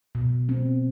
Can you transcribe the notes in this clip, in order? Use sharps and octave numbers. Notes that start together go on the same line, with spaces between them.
B2
C4